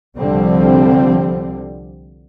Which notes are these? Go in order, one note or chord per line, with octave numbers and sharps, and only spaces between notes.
C2 D3 F3 G3 C4